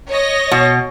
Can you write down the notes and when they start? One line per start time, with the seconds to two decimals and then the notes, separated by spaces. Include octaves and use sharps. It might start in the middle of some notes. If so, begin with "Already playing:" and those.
0.10 C#5 D#5 A#6
0.51 B2